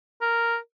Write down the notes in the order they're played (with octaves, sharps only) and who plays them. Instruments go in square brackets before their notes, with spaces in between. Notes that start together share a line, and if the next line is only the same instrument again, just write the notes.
[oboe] A#4